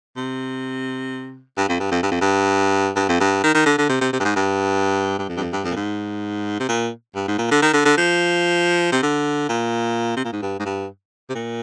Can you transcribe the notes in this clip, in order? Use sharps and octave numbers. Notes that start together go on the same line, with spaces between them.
C3
G2
F2
G2
F2
G2
F2
G2
G2
F2
G2
D#3
D#3
D3
D3
C3
C3
C3
G2
G#2
G2
G2
F2
G2
F2
G2
F2
A#2
G#2
C3
A#2
G2
G#2
A#2
D3
D#3
D3
D3
F3
C3
D3
A#2
C3
A#2
G#2
G2
G#2
G2
C3
A#2